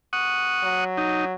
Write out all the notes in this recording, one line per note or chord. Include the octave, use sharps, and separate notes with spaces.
F#5 C#6 D#6
F#3
D#4